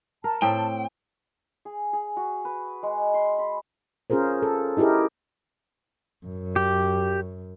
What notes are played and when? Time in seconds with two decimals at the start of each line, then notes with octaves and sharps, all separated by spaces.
0.24 A#4 A5
0.42 A2 C4 G5
1.65 G#4
1.93 G#4
2.17 F#4
2.45 B4
2.83 G#3
3.14 C6
3.39 B5
4.10 C#4 F4 G#4 A#4 C5
4.42 A4
4.77 D#4 E4 G4 G#4 A#4
6.26 F#2
6.56 G4